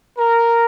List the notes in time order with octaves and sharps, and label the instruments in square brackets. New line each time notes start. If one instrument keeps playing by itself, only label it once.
[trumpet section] A#4